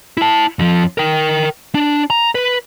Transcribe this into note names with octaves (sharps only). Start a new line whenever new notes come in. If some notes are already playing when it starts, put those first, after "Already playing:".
E4 A5
F2 F3
A#4 G5
D4
A#5
B4